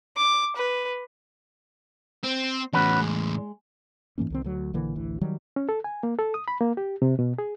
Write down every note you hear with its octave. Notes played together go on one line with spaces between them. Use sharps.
D6
B4
C4
E2 A2 C#4 F#4 B4
G#3
G#2 E3 A#3 C#4
C2 D#3 C4
D2 F#3
A#1 D3 E3 A#3
A1 D2 E3
D#3 F#3 G3
C#4
A4
G#5
A#3
A4
D#6
B5
A#3
G4
C3
B2
G#4